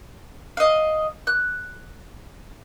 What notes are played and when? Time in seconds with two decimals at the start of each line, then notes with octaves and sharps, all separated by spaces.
0.57 D#5 F5
1.27 F#6